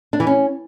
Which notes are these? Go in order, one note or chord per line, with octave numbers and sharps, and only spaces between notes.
D4
E3
C#4